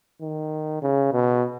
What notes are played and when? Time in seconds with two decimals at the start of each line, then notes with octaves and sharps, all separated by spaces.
0.21 D#3
0.82 C#3
1.12 B2